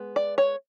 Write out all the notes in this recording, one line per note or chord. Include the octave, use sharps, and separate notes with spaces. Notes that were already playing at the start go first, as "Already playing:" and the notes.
Already playing: G#3 B3
D5
C#5